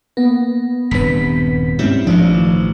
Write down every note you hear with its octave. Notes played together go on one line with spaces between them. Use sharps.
A#3 B3
D#1 G2 C3 B4 B6
G#2 G3 C4 C#4 E4
A1 G2 F3 D4
D#3